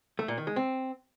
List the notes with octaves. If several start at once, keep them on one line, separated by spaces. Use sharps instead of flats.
A3
A#2
D#3
G#3
C4